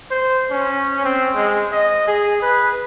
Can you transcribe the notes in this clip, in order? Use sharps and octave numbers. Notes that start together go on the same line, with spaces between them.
C5
C#4
C4
G#3
D#5
G#4
B4